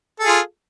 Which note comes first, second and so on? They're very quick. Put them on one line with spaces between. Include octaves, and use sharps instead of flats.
A4 G#4 F4